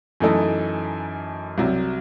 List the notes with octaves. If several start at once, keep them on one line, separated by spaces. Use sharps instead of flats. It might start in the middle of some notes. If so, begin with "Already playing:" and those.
F#2 E3 A3 D#4 A4
C2 C3 F#3